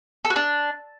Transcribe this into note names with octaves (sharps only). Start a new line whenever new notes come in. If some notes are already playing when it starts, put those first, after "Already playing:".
A4
F#4
D4